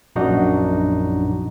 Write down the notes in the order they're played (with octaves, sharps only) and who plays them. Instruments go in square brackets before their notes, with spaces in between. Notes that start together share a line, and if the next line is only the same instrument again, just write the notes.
[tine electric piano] A#1 F#2 D4 D#4 F#4